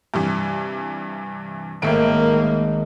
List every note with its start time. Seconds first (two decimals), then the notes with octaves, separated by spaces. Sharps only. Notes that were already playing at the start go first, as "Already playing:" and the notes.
0.14 G2 C3 E3
1.82 G#1 A2 A#3 E5 D7